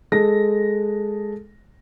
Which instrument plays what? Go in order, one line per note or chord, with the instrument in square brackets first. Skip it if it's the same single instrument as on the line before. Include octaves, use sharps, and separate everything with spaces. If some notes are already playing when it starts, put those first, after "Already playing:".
[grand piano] G#3 A4 A#6